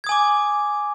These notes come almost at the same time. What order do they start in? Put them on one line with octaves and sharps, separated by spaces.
G#6 D#6 G#5 D6